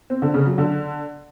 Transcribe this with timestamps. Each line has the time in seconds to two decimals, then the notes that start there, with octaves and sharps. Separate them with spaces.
0.10 C4
0.22 D3
0.34 C#3
0.46 F#3
0.58 D3